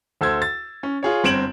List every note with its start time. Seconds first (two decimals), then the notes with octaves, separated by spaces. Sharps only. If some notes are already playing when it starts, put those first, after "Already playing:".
0.21 D2 A4 C5 E6 G#6
0.42 A6
0.83 C#4
1.03 F4 G#4 C#5
1.24 G1 C4 G#6 D7 E7 F#7